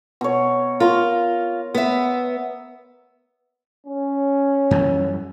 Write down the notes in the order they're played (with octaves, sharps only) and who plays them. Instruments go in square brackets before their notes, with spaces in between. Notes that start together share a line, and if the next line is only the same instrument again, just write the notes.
[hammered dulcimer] B2 C#5
[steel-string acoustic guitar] F4 [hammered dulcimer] A#4 C6
[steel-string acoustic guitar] B3 E5
[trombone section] C#4
[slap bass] F#2 E3 G3